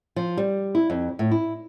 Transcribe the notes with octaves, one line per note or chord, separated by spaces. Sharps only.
F3
G3
E4
F2
A2
E4